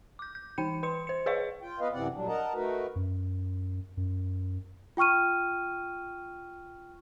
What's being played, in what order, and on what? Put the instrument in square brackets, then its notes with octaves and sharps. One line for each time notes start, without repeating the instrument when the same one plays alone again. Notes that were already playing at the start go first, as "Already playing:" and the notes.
[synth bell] D6 G6
G6
E3 D#4 G5 C#7
B4 C6 C#7
C5 C#7
G#4 B4 C#5 D#5 F5 C#6
[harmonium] F4 G5
B3 B4 D#5 F5
F#2 C3 E3 C4 D5 F#5
A#2 F#3 G3 D4
A#4 D#5 F#5 A5 A#5
A3 D#4 F#4 A#4 B4
[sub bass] F#2
F#2
[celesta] F4 G5 C#6 F6 D#7